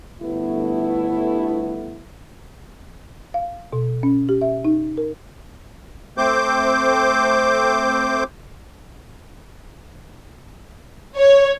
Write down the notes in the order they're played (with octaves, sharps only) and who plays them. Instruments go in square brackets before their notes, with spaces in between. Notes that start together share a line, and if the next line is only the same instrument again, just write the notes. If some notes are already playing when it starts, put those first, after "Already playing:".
[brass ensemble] G1 A3 B3 E4
[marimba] F5
B2
C#4
G4
E5
D#4
A#4
[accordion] A3 C4 C5 D6 G6
[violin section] C#5